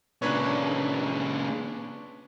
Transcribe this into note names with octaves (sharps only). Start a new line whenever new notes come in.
A#2 C#3 D4 B4 C#5